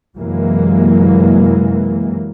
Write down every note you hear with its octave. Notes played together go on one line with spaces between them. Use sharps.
F#2 C3 E3 F#3 G#3 A#3